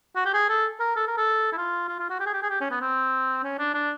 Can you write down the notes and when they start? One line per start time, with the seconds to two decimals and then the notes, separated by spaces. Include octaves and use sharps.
0.16 F#4
0.25 G4
0.34 G#4
0.49 A4
0.80 A#4
0.96 A4
1.07 A#4
1.17 A4
1.53 E4
1.58 F4
1.88 F4
1.99 F4
2.10 F#4
2.20 G4
2.26 G#4
2.33 G4
2.43 G#4
2.50 G4
2.61 C#4
2.71 B3
2.81 C4
3.43 C#4
3.59 D4
3.74 D4